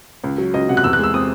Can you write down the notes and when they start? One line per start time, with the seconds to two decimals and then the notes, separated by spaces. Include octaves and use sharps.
0.24 C#2
0.38 F#3
0.54 C#2 D#5
0.68 C3 F#5
0.77 F#6
0.84 E2 E6
0.93 F#6
0.99 G#3 E6
1.14 C4 D#6